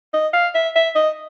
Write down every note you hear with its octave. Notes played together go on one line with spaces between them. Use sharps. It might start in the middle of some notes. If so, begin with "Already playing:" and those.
D#5
F5
E5
E5
D#5